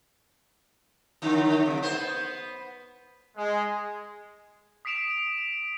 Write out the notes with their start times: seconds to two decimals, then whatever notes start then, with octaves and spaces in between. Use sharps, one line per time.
1.22 F#2 D3
1.66 C3
1.83 B3 C5
3.36 G#3
4.85 D#6 B6 C7 D7 E7 F7